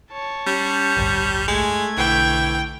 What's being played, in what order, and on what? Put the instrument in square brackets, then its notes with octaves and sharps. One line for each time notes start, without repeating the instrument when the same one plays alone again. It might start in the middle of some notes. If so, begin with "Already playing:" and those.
[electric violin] C#5 A5
[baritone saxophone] G3 [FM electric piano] C#4
[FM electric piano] A1 D2 G2
[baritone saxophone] G#3 [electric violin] A3 G#6
[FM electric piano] B1 D3 [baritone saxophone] E3 [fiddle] G5